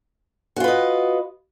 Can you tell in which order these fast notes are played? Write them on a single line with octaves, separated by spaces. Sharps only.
F#4 F4 B4 D#5